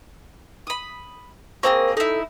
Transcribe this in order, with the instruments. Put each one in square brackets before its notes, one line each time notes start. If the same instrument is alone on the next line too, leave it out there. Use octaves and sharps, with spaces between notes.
[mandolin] B5 D#6
[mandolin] A#3 C4 G#4 [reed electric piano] A#4 C5 C#6
[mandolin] D#4 E4 [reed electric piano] A4